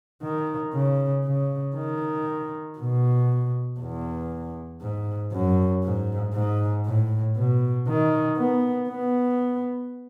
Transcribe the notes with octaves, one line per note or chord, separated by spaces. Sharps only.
D#3
C#3
C#3
D#3
B2
E2
G#2
F#2
G#2
G#2
A2
B2
D#3
B3
B3